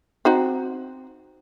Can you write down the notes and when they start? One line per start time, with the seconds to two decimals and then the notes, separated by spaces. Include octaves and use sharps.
0.25 C4 D#4 F#4